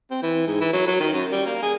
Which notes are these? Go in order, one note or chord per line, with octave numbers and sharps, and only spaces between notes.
C4
E3
G#2
E3
F#3
F#3
D#3
F#2
G3
A#3
G#4